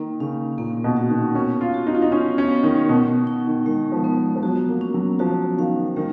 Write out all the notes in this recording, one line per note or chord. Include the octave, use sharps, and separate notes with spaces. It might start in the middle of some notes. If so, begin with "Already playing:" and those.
Already playing: D#3 A#3
C#3 C#4
A#2 A#3
B2
F#4
D#3
B3 C#4
F4
F#4
D#4
F4
D#4
B3 C#4
C#4
B3
D#3
B2 B3
D#4
D#3
D#3 G#3
F3
B3
F3
F#3 F#4
A#3
C#4
F#3
F3 F#4
D#3 F5
D#3 G#3